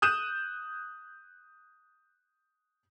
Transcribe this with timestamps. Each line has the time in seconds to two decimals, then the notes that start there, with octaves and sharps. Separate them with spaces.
0.02 D#6 F#6 G6 D#7 E7